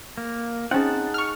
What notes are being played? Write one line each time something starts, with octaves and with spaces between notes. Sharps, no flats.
A#3
C4 C#4 D#4 G#4 F#5 A5
C#6 F6